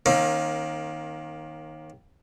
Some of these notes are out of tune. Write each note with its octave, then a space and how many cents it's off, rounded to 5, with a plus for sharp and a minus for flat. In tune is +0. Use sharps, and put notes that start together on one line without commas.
D#3 +0 A#3 +15 C#4 -40